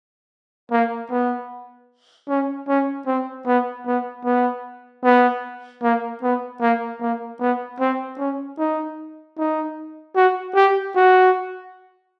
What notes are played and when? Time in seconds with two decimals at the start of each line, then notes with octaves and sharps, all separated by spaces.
0.71 A#3
1.10 B3
2.29 C#4
2.68 C#4
3.07 C4
3.47 B3
3.86 B3
4.25 B3
5.04 B3
5.83 A#3
6.23 B3
6.61 A#3
7.01 A#3
7.40 B3
7.80 C4
8.19 C#4
8.58 D#4
9.38 D#4
10.16 F#4
10.55 G4
10.96 F#4